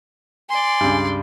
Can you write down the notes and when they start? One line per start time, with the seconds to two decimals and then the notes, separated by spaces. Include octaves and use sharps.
0.49 D5 G#5 C6
0.80 C#2 G2